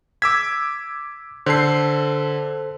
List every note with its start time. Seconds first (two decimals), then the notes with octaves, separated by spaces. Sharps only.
0.22 D6 E6 G#6 B6
1.46 D3 A4 C5 C7